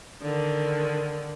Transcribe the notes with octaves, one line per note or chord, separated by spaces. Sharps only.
D3 D#3